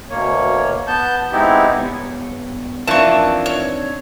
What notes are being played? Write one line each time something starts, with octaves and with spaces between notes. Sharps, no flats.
D2 B2 A#3 C#5
B3 A5 G6
G#3 B3 C4 D#4 E4 G4
G2 B3 C#5
E3 F3 A#3 C4 D4 D#4 A5 C#6
C#5